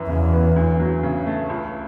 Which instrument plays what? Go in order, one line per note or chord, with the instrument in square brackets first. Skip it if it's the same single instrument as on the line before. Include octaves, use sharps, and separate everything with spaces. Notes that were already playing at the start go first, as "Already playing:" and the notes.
Already playing: [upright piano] F#2 E3
[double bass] E2 [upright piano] C#3
[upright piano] B3
D2
F#3
C#3
A3
C#2